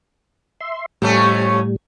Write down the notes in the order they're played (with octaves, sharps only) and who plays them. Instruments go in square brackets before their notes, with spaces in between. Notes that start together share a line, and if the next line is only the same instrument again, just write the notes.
[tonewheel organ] E5 C6
[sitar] F2 A3 C#4 [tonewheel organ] A2 G3